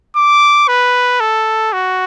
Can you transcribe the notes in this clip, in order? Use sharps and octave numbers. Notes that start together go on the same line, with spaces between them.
D6
B4
A4
F#4